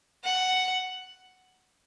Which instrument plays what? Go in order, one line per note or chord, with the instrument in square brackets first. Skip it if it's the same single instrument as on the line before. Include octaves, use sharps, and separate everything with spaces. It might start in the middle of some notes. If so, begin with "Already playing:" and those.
[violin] F#5